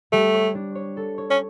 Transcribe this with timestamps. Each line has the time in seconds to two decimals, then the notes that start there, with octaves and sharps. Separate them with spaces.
0.12 G3 A3
0.34 C#5
0.55 D4
0.75 C#5
0.97 A4
1.18 C#5
1.30 C#4